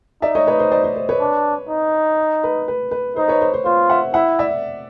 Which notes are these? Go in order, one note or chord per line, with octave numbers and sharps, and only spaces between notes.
D#4 D5 E5
C#5 D#5
B4 C#5
C5
C5 D5
C5
C5
B4 C#5
D4
D#4
B4
B4
B4
D#4 C5
B4 C#5
C5
C5
F4 C5
E5 F#5
E4 E5 F#5
D5 E5